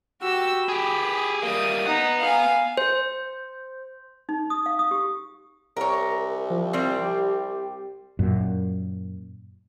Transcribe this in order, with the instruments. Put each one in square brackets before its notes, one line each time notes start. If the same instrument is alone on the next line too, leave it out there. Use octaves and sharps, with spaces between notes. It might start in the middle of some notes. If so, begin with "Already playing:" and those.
[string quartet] F#4 G4 E6
[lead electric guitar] G4 G#4 [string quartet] B5
[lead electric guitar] G3 A#3 [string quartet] D#6
[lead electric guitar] B3 F#5 [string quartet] D#4
[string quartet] F5 G#5
[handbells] C5
[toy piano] D#4
D#6
F5
D#6
G4
[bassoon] C2 [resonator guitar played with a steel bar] A#4 C#5
[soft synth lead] F3
[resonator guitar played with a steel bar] G3 C4
[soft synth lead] G4
[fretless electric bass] F#2 A#2